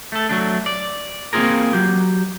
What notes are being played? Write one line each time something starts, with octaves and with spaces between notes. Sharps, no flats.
A3 A4
F#3 A3 D4
D5
A#3 C4 C#4 F4 G#4 A#4
F#3 G4